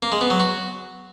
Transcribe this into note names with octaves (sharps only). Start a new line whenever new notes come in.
A#3
G#3
B3
F#3
F#4